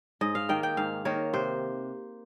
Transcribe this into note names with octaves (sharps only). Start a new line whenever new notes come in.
G#2 D#5
F5
D#3 A#3 G5
G5
G#2 F5
D#3 A#3 C#5
C3 C5